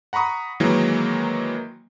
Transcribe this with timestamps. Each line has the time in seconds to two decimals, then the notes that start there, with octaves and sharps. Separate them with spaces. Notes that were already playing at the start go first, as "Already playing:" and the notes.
0.13 F#5 A#5 B5 C#6 D#6
0.60 D#3 E3 F#3 G#3 A#3